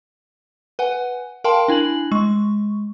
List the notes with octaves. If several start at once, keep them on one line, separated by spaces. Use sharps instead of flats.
B4 F#5 G#5
A#4 F5 G5 A5 C6
D4 E4 G#5 F#7
G#3 C#6